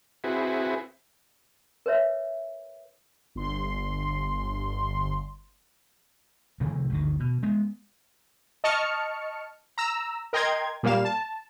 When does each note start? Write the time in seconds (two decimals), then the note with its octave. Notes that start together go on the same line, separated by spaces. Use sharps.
0.24 C4 E4 F#4 G#4 B4
1.86 A#4 B4 C#5 E5
3.35 G1 C6
6.60 C3 D#3 F3 A3
6.90 G1 D2 D#3
7.20 B2
7.43 G#3 B3
8.64 D#5 A5 C#6 F6 C#7
9.78 A#5 E6
10.33 A#4 D#5 G5 A#5 C6 G#6
10.83 A#2 G3 A#3 F5 E7
11.05 A5